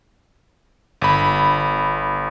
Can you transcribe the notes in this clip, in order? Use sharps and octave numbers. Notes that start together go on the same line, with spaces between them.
G1 B5